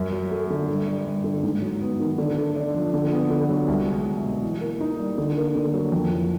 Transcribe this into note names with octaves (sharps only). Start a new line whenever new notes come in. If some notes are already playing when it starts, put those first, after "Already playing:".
Already playing: F#2
F#3
A3
D3
G2
G3
G2
D3
G#2
F#3
B3
D#3
D3
A3
D4
F3
D3
B3
D3
F#3
C2
G#3
C2
B2
E3
A#3
D#4
G3
D3
A#3
D3
F#3
F2
E3